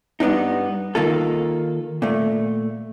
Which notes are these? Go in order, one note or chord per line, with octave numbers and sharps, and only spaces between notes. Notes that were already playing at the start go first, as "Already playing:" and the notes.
G2 B3 D4 D#4
D#3 A#3 F4 A4
A#2 A3